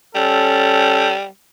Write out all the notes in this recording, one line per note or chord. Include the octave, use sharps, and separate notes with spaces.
G3 C#4 A4